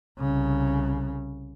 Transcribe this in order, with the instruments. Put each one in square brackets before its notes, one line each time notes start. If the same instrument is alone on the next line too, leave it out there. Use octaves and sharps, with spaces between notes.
[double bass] C2 C#3